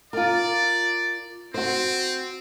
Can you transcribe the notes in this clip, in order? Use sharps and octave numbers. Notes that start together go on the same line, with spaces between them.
F4 A#4 D5
C4 F#4 C5